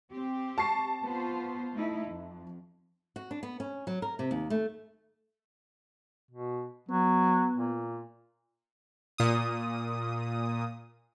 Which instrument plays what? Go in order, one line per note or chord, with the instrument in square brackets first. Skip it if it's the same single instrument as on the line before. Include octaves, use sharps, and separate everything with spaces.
[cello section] C4 G4
[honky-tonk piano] A5 C#6 C7
[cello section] B3 F4 C5
A3 D#4 E4
F2
[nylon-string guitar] F#4
D4
B3
C#4
F#3
A#4
C3
D#2
A3
[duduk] B2
[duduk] F#3 [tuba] B3
[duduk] A#2
[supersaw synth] A#2 D#6